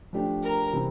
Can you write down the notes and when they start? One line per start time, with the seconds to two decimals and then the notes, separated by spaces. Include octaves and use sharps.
0.13 F3 A3 D4 G4
0.43 A#4
0.73 C3 E3 G3 C4